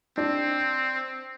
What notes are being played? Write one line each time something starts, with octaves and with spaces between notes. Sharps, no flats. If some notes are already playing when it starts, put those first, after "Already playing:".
C4 D4